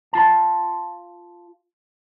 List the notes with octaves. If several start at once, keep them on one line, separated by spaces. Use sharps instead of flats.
F4 A5